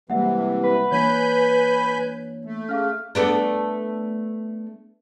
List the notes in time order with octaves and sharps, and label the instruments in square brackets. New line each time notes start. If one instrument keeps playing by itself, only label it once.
[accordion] C3 E3 [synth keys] G3 G#3 A#3 [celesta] E5 F#5
[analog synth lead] B4
[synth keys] E3 A#3 D4 [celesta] C#5 [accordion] G#5 B5 G6
[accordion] A3
[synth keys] C#4 [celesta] G#4 F5 F6
[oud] A3 B3 D4